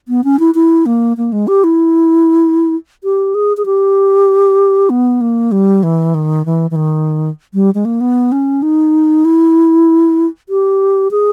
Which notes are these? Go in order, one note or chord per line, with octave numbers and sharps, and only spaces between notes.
B3
C#4
E4
E4
A#3
A#3
G#3
G4
E4
G4
G#4
G#4
G4
B3
A#3
G3
E3
D#3
E3
E3
D#3
G3
G#3
A#3
B3
C#4
D#4
E4
G4
G#4